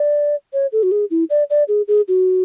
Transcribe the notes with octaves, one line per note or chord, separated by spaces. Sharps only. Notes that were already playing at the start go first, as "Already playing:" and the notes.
Already playing: D5
C#5
A4
F#4
G#4
E4
D5
D5
G#4
G#4
F#4